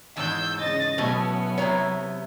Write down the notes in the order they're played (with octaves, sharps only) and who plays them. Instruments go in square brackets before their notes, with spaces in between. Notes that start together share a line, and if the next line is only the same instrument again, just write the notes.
[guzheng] E2 G#2 [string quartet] E6 G6
[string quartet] C#3 D#5 A6
[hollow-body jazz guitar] B2 [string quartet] F#3 B3 [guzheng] A3 C#4
[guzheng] C3 E4 [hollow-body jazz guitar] C#5 A#5